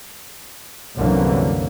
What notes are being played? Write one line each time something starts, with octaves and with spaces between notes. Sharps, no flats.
C2 F#2 D3 E3 F#3 A#3